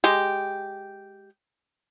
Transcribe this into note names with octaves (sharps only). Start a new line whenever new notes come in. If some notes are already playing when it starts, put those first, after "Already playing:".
G#3 G4